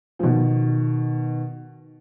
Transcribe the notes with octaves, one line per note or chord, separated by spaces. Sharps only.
F3
B2 D#3